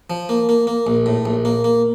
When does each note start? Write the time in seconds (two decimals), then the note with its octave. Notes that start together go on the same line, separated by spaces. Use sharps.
0.10 F3
0.29 A#3
0.49 A#3
0.67 A#3
0.87 A#1
1.06 A2
1.25 A#1
1.45 A#3
1.64 A#3